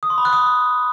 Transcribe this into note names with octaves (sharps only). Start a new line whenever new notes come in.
D#6
C6
B5
F#6
D#6